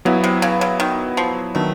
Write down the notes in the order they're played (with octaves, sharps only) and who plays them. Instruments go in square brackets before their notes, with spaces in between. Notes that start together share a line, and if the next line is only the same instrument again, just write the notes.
[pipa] C#3 [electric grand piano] F#3 B3 E4
[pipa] C3
C#3
C#3
D#3
F3
[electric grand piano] D#3 F#3 B3 D4 [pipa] A3